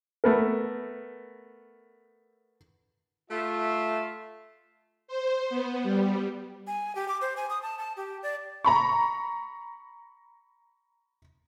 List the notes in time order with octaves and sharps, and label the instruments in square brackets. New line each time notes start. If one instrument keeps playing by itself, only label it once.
[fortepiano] A3 B3 A#4
[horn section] A3 F4 E5
[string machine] C5
B3
G3
[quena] G#5
G4
D6
C5
G#5
D#6
A5
A5
G4
D5
[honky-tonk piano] A#5 B5 C#6